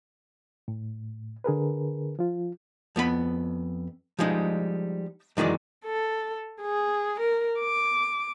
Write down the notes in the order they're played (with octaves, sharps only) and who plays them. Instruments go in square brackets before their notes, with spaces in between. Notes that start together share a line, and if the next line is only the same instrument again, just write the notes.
[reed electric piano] A2
D3 G#4 A#4 B4
F3 F4
[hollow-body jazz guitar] F2 B3 G#4 B5
F3 G3 G#3 D#4
F#2 D#3 E3 G#3 D5
[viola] A4
G#4
A#4
D6